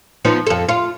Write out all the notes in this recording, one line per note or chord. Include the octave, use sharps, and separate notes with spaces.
F3 B3 D#4
F2 A4
F4